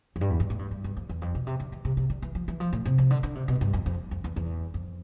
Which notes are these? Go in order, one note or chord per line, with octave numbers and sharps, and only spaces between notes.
F2
G2
E2
G2
A2
G2
G2
G2
F2
E2
F2
B2
C3
D3
E3
C3
C3
D3
E3
F3
E3
F3
A2
C3
C3
D3
D3
C3
B2
G2
F2
F2
F2
E2
E2
F2